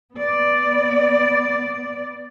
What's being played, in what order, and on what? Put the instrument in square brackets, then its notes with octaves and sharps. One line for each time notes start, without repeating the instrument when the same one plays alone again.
[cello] B3 D5